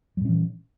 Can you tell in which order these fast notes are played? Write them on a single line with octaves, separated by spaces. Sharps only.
G3 A#2 C#4 E3